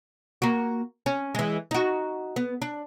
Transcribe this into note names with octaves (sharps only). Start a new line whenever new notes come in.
A#3 F#4
C#4
E3 G#3
D#4 F#4
B3
D4